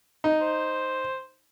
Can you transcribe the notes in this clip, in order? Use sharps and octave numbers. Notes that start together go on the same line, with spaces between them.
D#4
C5